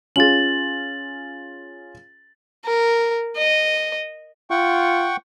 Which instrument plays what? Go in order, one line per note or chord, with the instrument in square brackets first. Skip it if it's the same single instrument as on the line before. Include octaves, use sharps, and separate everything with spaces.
[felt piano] C#4 F4 G#4 [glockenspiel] A6 F#7
[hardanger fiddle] A#4
D#5
[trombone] F4 [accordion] F#5 G5 C#6